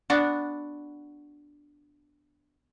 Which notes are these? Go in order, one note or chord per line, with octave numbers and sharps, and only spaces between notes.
B3 D4 F#4